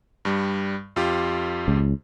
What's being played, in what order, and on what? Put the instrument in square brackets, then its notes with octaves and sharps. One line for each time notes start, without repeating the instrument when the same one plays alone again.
[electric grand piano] G2 G3
F2 F4 G4
[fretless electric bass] C#2